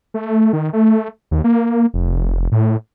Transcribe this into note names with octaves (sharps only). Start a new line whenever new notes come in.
A3
D#3
A3
D#2
A#3
F1
A2